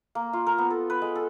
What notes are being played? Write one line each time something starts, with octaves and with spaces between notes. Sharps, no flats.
A#3
F4
A#4
B3
A4
B4
G#3
A4